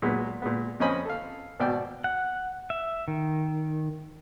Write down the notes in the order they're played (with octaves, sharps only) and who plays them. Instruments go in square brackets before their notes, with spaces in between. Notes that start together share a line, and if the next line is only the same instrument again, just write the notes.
[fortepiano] A#2 F#3 G#3 B3
A#2 G#3 B3
F2 C4 C#4 D#5 G#5 B5
A4 F5
G#1 B2 D5 G5
[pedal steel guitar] F#5
E5
D#3